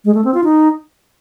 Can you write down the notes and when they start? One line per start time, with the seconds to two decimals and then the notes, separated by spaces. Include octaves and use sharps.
0.05 G#3
0.15 A3
0.24 C4
0.34 F4
0.44 D#4